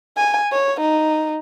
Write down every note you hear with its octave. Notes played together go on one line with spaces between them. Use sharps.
G#5
C#5
D#4